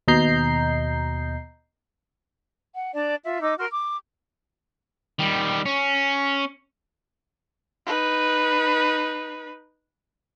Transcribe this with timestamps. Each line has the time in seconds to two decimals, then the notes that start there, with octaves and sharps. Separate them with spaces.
0.08 D#2 B2 D#5 A#5 G6 C7
2.74 F#5
2.94 D4 D5 A5
3.24 F4 E5
3.41 D#4 D#5 D6 E6
3.59 F#4 A#4 C6 F6
3.70 D6
5.19 D#3 G3
5.66 C#4
7.86 D#4 B4